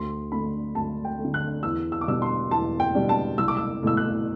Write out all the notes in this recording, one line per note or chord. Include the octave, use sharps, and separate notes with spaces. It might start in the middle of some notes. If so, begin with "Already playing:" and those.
Already playing: D2 C6
D3 A3 B5
D2 A5
G5
A3
D3
F#6
E2 E6
E6
D6
B2 G3 D4 E6
C6
E2 A5
G5
B2 G3 D4
A5
C2 E6
D6
E6
B2 A3 E4 E6
F#6